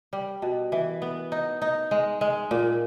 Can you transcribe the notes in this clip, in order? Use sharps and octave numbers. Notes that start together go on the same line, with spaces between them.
G3
B2
E3
B3
D#4
D#4
G#3
G#3
A#2